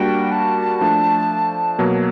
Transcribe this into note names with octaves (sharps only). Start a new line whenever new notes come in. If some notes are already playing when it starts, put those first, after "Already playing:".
Already playing: G3 A#3 D4 F#4 G5
A5
F3 A3 D4
B2 F#3 A#3